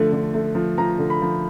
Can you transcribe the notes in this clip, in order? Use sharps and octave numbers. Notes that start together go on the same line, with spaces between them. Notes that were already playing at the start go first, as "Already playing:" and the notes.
Already playing: D3 F3 A3
D3
A3
F3
F3 A#5
D3
B5
F3